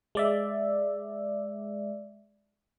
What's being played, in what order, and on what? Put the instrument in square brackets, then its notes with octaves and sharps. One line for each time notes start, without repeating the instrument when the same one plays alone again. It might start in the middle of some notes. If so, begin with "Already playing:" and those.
[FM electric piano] G#3 D5 E5